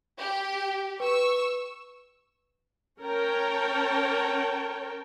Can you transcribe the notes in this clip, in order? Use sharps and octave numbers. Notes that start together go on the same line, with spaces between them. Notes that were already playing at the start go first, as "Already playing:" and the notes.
G4
B4 C#6 E6
C#4 A#4 C#5 G5 A5